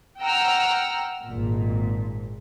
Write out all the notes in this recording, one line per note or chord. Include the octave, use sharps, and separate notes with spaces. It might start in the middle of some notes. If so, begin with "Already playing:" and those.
F#5 G5 A#5 E6 F6
G#1 A#2